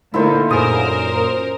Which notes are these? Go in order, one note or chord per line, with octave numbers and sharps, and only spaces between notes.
A#2 D3 A3 A#3 D#4 E4 C5 F5
F#2 A#2 G#4 A#4 C5 D#6